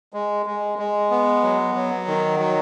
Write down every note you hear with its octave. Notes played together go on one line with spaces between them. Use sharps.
G#3
G#3
G#3
B3
F#3
F#3
D#3
F#3